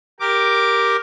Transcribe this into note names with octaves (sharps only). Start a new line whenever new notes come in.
G4 A#4 D6